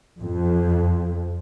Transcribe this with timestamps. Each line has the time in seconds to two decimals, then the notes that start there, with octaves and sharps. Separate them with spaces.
0.20 F2